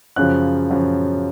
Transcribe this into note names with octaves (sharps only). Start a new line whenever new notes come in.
F#2 C#3 F3 F#6
F#2 C#3 F3